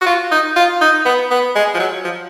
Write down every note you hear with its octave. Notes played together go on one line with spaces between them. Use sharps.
F#4
F4
D#4
F4
D#4
B3
B3
G#3
F3
F#3
F3